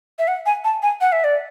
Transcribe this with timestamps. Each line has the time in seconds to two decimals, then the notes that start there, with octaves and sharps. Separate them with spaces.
0.19 E5
0.28 F#5
0.46 G#5
0.64 A5
0.82 G#5
1.01 F#5
1.12 E5
1.24 D5